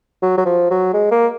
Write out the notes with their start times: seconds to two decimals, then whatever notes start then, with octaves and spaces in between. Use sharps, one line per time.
0.22 F#3
0.38 F#3
0.46 F3
0.70 F#3
0.94 G#3
1.11 A#3